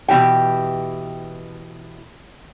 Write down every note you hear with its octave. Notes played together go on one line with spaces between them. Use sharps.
B2 E3 G4 G5